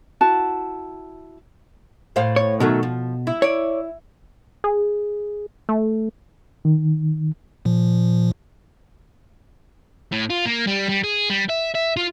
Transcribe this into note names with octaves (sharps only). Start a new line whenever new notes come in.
E4 F#4 A5
A2 C5 F5
C#5
B2 D#3 F#3 A3
F3
E4
C#5 D5
G#4
A3
D#3
A#2 F3
A2
F4
A#3
G3
G3
G#4
G3
E5
E5
F4